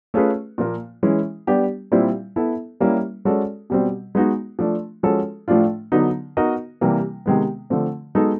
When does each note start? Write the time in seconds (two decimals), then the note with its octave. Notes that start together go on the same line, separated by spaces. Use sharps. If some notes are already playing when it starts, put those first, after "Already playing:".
0.14 A3 C#4 F4 G#4 B4
0.58 A#2 F3 A#3
1.03 E3 G#3 C#4 E4
1.47 G3 B3 D4 G4
1.92 A#2 G3 C4 E4
2.36 B3 E4 A4
2.80 G3 A#3 C#4 E4
3.25 G#3 C#4 F#4 A4 D5
3.70 B2 G3 C4
4.15 G#3 B3 D#4 F#4
4.59 F3 A3 D4
5.03 F3 G#3 C#4 F#4 A4
5.48 A2 F3 A3 D4 F4
5.92 D3 F#3 B3 D#4
6.37 B3 D#4 F#4 A#4 D#5
6.81 C3 E3 G3 A#3
7.26 C3 D#3 G#3 B3
7.70 D3 F3 A3 C4
8.15 G#3 B3 D#4 F#4 A4